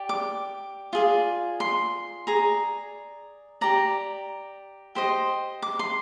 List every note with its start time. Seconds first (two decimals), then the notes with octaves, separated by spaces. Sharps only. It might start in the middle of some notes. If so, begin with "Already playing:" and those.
Already playing: G4 D5
0.09 D6
0.93 F4 G#4 D5
1.60 C6
2.27 G#4 D5 A#5
3.61 G4 D5 A#5
4.95 G4 C5 D#5
5.62 D6
5.79 C6